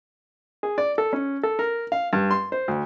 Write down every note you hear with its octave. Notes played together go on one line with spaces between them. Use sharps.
G#4
D5
A4
C#4
A4
A#4
F5
G2
C6
C5
D2